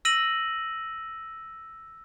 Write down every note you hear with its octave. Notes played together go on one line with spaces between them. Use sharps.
E6 A#6 D#7 F#7